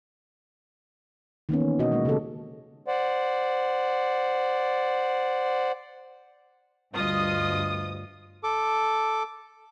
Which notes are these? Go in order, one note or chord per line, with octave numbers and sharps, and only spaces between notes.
D#3 A#3 B3 C#4
E3
B2 F#4 D#5
G#3 A#3
C#3 B3 D#4 G4 A4
C5 D5 F#5
D2 G2 F4 D#5 D#6
A4 D6